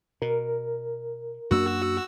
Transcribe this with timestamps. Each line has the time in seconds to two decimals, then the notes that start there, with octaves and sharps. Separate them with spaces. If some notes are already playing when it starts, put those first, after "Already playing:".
0.22 B2 A#4
1.51 F#2 A#3 D4 F#4 E6